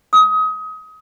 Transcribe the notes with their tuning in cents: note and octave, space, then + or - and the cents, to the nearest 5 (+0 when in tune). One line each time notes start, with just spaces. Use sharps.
D#6 +25